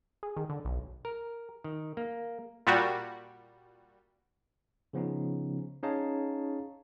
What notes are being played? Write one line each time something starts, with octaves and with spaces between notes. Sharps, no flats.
G#4
D#3
D3
B1
A#4
D#3
A#3
A#2 G3 F#4
C#3 F3 B3 C#4 D#4
C#4 D#4 G#4 C#5 F5 A5